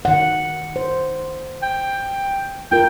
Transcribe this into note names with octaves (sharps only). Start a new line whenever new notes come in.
D#3 F#5
C5
G5
F4 A#4 G5